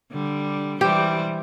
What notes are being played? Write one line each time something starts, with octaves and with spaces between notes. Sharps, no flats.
D3 G3
E3 G3 G4 C5